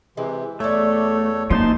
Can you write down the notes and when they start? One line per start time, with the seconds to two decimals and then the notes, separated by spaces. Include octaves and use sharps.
0.17 C3 E3 G#3
0.60 E2 A3 A4 C#5 D5 E5
1.50 F#2 F3 A#3 D#4 A5 C6